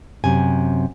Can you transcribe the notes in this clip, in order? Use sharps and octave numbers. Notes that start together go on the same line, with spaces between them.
F#2 C3 G#5